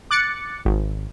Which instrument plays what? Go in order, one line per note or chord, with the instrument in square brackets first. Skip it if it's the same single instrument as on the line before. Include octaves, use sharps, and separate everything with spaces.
[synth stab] D6 F#6 A6 C#7
G#1